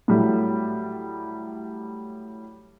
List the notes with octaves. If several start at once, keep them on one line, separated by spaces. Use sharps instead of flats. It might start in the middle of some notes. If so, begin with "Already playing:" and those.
A2 F#3 G3